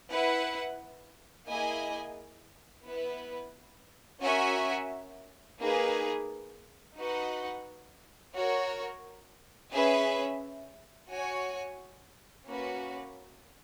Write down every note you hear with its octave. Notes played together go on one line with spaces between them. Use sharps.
E4 B4 F#5
A#3 E4 G#4 D#5 G#5
B3 E4 B4
C#4 F#4 A#4 E5 G#5
A#3 D#4 G#4 B4
D#4 F#4 B4 D#5 F#5
F#4 A#4 C#5
C#4 G#4 B4 E5
F#4 C#5 G#5
A#3 C#4 F#4 B4